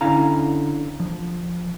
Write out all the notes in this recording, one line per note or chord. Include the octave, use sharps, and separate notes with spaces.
D3 C#4 E4 F5 A#5
F3